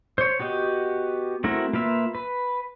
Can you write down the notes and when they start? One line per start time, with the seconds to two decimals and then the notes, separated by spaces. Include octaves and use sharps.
0.18 C5 C#5
0.40 B3 F#4 G4 D#5
1.44 A3 C4 E4 F#4 A#4
1.73 A#3 F4 B4 E5
2.15 B4